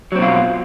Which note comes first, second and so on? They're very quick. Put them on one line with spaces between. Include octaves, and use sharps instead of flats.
F#3 C4 B2 F4